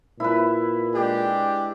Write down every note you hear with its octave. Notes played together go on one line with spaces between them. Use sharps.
A#2 E4 B4
G#3 D4 G4